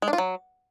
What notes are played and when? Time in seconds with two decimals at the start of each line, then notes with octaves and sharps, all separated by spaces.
0.02 G#3
0.08 D4
0.13 F4
0.18 F#3